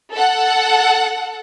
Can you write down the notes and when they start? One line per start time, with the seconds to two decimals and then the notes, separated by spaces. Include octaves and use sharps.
0.14 A4 F#5